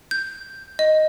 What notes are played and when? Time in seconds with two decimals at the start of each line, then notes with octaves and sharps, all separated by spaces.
0.11 G6
0.79 D#5